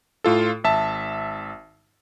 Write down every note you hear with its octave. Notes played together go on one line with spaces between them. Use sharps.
A2 F4 A4
G#1 E5 A5